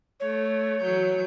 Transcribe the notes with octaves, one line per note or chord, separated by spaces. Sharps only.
A3 C#5
E3 F#3 G6